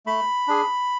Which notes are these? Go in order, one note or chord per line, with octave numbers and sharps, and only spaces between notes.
A3 B5
D4 G#4